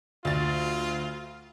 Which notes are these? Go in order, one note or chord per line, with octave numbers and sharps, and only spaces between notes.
D2 F4 A6